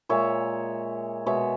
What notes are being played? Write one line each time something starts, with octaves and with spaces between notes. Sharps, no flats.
A#2 G#3 C#5 E5
B2 G#3 C#5 E5